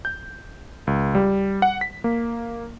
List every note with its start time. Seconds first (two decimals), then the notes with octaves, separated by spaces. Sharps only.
0.05 G6
0.87 C#2
1.15 G3
1.62 F#5
1.81 B6
2.04 A#3